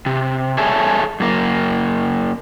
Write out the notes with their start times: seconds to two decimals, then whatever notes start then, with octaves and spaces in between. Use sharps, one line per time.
0.06 C3
0.58 G#4 A4 C#5 E5 G#5 A5
1.20 F#2 A#3